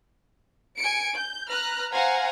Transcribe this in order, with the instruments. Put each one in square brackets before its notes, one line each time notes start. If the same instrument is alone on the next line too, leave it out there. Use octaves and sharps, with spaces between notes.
[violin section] G#5 C#7 D7
G6
B4 A#5 F6 F#6
C5 F5 F#5 G#5 A#5